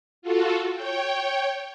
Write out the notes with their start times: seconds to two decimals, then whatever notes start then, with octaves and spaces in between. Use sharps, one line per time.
0.22 F4 F#4 A4
0.74 C#5 G5